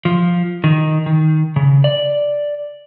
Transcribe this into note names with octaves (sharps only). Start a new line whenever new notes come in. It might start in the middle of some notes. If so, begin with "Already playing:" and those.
F3
D#3
D#3
C#3
D5